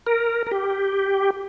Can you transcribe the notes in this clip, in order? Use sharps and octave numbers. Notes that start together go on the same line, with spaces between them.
A#4
A#4
G4